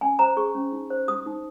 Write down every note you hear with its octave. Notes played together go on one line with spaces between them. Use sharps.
C#4 G#5
C5 A#5
G#4 C#6
C#4
D#4
C5
G4 D#6
D#4